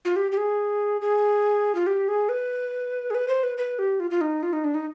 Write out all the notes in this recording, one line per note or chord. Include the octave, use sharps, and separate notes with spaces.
F4
G4
G4
G#4
G#4
F4
G4
G#4
B4
G#4
B4
C5
B4
B4
G4
F4
F4
D#4
F4
D#4
D4
D#4